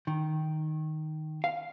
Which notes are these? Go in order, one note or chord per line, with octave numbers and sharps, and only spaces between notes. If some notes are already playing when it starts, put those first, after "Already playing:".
D#3
F5